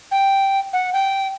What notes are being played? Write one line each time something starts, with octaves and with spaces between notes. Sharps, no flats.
G5
F#5
G5